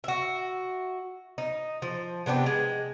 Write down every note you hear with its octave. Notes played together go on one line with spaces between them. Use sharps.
F#4 E5
D#4
F3
C3 B3 D4 G4
G#3